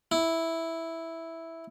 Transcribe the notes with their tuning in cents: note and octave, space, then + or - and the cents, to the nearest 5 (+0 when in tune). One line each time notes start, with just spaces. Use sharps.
E4 -5